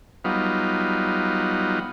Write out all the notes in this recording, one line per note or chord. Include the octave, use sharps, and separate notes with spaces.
F#3 G3 B3 D#4 F4